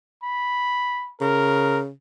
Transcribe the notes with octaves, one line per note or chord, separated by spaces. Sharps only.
B5
C#3 A#4